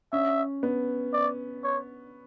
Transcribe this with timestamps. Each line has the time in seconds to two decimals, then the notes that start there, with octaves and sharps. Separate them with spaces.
0.12 C#4 E5
0.63 B3
1.13 D5
1.64 C#5